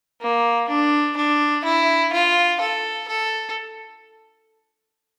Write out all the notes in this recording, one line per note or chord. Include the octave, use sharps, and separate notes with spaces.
A#3
D4
D4
E4
F4
A4
A4